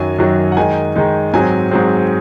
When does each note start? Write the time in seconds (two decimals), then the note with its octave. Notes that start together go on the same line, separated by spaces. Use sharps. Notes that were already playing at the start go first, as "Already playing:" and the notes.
Already playing: F#2 D#3 F#3 G#5
0.19 F#2 D#3 F#3
0.52 F#5
0.57 D#3 G#3 D#4 G#5
0.96 D#3 G#3 D#4
1.34 G#2 F#3 C4 G#5
1.71 G#2 F#3 C4